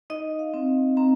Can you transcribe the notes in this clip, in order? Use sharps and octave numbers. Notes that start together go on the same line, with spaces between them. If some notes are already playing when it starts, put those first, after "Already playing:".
D#4 D#5
F5
C4
C4 A#5